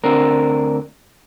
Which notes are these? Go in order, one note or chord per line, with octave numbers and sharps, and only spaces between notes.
D2 C4 D4 A#4